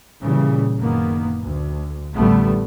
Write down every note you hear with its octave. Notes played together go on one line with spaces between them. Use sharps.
A#2 C#3 E3 G3
F#1 A#2 D#3 A#3 B3
D2
A1 D3 G3 A3 B3